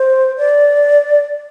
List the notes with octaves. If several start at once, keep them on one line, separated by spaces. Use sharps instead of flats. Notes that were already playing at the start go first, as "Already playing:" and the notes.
Already playing: C5
D5